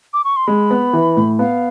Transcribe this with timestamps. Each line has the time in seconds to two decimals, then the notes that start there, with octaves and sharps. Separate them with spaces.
0.13 D6
0.25 C#6
0.36 C6
0.47 G#3 B5
0.70 B3
0.93 E3
1.17 A2
1.39 B3 F5